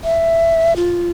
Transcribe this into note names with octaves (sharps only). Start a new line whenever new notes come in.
E5
F4